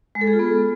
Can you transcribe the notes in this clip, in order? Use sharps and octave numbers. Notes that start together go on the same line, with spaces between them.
G#3
A4
G#4
F4
B3